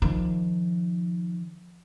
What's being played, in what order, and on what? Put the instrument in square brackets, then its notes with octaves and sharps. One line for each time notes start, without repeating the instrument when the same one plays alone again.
[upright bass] D#3 F3